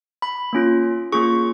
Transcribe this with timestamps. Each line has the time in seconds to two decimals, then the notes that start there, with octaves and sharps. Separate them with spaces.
0.22 B5
0.53 A#3 C#4 F4
1.12 A#3 C#4 F4 G#4 C#6